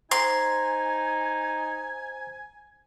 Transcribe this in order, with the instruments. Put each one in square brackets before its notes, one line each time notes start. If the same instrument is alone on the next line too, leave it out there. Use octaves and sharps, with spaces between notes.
[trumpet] D#4 [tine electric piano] C5 A#5 [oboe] G#5 [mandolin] C6